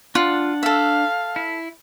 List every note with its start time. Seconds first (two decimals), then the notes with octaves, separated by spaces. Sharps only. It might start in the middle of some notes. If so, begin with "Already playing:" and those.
0.15 D4 F4 F#5
0.63 A4 E5 F5
1.36 E4